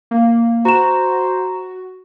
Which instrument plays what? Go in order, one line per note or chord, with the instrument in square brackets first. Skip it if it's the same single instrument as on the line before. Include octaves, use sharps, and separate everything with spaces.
[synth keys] A#3
[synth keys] F#4 [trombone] C5 [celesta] A#5 E7